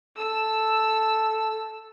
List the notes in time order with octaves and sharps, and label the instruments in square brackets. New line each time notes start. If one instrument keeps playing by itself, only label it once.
[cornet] A4 [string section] E6